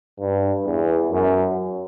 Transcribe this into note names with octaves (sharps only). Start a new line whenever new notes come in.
G2
E2
F#2